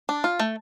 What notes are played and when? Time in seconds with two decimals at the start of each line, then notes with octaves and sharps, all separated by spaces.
0.09 D4
0.24 F4
0.40 A3